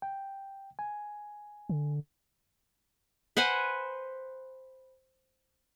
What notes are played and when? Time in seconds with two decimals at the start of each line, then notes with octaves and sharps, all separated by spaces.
0.02 G5
0.79 G#5
1.69 D3
3.37 B4 C5 F#5 G#5